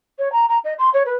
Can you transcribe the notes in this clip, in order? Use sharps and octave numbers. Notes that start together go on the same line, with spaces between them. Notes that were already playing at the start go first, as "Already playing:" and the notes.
C#5
A#5
A#5
D#5
C6
C#5
B4